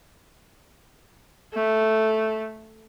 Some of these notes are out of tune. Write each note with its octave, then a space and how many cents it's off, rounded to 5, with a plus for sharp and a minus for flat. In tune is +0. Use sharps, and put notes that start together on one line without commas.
A3 -5